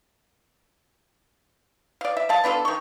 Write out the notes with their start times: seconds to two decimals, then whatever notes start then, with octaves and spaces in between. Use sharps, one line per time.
2.01 D5 F5
2.17 E5
2.29 D5 F5 A5
2.44 B3 D4 F4 A4
2.65 D#3 C#6